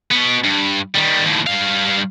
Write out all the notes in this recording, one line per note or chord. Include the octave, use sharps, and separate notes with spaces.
B2 B3
G2
D#3 G3
D#2 A2
G2 F5